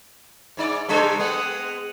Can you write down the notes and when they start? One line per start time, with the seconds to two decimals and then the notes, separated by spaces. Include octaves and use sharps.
0.57 G#2 D#4 D5
0.88 C#3 G3 D4 A4 C5
1.19 G#3 B3 F#5 D#6